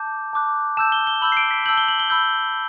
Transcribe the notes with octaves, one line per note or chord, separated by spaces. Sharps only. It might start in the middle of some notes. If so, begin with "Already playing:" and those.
Already playing: A5 D6 G6
A5 D6 F#6
A5 E6 G6 E7
G7
G7
B5 E6 G6 F#7
C7
D7
B6
A5 E6 G6 F#7
G7
F#7
G7
B5 E6 G6